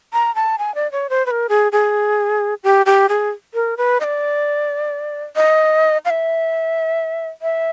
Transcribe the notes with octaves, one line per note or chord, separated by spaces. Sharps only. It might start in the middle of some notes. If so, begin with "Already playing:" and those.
A#5
A5
G#5
D5
C#5
C5
B4
A#4
G#4
G#4
G4
G4
G#4
A#4
B4
D#5
D5
D#5
F5
E5
E5